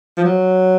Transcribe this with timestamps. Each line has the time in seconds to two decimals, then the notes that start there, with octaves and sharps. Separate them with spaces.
0.17 F3
0.24 F#3